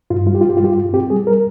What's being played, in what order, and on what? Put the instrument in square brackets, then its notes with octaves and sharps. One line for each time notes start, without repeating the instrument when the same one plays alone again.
[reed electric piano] G2 F4
G3 F4
G4
F4
G2
G4
F4
G3
G4
F4
G2
F4
C4 G4
G3 G#4
G3 A#4